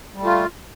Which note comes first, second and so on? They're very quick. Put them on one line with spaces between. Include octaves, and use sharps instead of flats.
G3 A3 F4